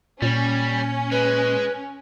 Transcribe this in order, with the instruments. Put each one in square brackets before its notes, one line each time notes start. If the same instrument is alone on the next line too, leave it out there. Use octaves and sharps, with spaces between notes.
[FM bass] A#2 [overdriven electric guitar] G3 [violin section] C#4
[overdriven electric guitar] G#3 [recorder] B4